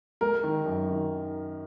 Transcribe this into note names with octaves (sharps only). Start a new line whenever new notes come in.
G#3 A#4
D#3
F#2
D#3